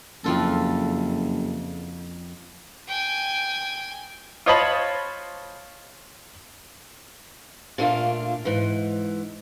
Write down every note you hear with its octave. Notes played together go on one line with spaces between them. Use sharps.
F#1 F2 F4 A4
G5 G#5
F4 C5 C#5 D#5 A5 B5
A#2 A3 A#3 D4 F4
G#2 E3